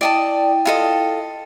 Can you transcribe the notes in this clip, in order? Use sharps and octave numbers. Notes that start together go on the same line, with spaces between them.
E4 D5 D#5 G5 A5
F4 A4 D#5